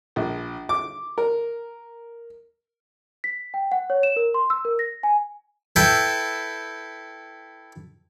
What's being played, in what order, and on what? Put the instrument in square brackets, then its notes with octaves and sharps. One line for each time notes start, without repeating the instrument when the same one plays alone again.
[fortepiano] A#1
D6
A#4
[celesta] B6
G5
F#5
C#5
E7
A#4
C6
E6
A#4
A#6
G#5
[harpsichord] E4 A4 B4 G5